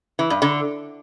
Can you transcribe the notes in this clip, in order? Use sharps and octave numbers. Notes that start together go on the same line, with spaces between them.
E3
G2
D3